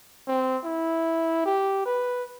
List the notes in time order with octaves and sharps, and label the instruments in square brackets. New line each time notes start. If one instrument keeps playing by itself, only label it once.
[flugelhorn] C4
E4
G4
B4